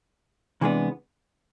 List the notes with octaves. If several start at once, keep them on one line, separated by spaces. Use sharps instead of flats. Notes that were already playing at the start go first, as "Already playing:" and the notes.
C3 E3 G#3 B3 D4